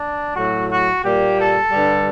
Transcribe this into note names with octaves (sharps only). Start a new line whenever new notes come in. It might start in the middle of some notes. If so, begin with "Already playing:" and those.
Already playing: D4
A2 F#3 A3 F#4
F#4
A#2 G3 A#3 G4
A4
G2 D3 G3